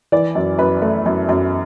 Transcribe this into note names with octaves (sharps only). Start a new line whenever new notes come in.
E3 D5
F#2
F#2 B4
A3
F#2
F#2